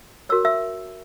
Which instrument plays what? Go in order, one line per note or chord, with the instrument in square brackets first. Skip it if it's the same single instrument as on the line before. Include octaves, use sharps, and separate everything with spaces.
[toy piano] F#4 A#4 C#5 E6
E5 E6